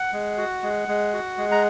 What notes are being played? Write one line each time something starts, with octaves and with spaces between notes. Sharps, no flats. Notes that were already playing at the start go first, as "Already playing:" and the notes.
Already playing: F#5
G#3
F#4
G#3
G#3
F#4
G#3
A#5